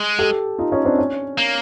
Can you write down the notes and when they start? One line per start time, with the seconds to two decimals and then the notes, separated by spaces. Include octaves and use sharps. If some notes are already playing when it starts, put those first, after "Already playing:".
Already playing: G#3
0.19 G4 A4
0.59 D#4 F4
0.72 C#4 D#4
0.85 C4 D4
0.98 C#4
1.38 A#3